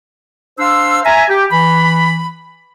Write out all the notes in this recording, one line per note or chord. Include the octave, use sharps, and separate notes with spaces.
D4 C5 F5 C6 E6
E5 G#5 A#5
G4
E3 B5